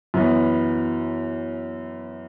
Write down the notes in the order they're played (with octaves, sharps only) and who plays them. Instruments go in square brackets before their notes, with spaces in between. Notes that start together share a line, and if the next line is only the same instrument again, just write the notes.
[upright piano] F#2 E3 B3